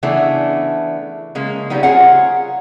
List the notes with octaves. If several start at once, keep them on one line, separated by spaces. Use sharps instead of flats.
C#3 E3 A3 B3 D4
C#3 G#3 A#3
C#3 G3 B3 D#4
F4 G#4 A#4 C#5 F#5